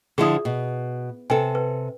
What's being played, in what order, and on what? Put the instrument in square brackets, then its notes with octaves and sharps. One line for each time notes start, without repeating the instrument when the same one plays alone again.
[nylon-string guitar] D3 F3 E4 [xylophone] G#4 D#6
[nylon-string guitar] B2
[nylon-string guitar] C3 A4 [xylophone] B4 G5 G#5
[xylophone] B4